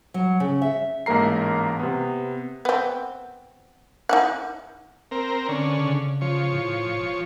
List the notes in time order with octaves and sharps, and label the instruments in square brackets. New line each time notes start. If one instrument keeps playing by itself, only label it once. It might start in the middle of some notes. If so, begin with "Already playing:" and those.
[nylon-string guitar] F#3
C#3
E5
[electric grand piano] A1 G#2 A#3 A#4 A#5 C7
C3 B3
[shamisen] B3 C4
D#4 E4 F#5
[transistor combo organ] C4 A#4
D3 C#4
[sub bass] C#3
[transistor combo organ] F3 C#5
[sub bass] A2
E1